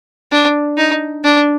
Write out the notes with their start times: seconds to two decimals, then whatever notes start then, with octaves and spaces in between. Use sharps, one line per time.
0.32 D4
0.78 D#4
1.24 D4